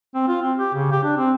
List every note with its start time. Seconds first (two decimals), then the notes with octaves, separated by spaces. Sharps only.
0.15 C4
0.28 F4
0.43 C4
0.58 G4
0.75 C#3
0.92 G4
1.03 D4
1.17 C4